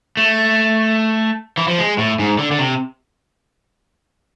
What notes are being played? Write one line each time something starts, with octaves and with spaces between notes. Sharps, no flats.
A3
E3
F3
G#3
A2
G#2
D3
D3
C3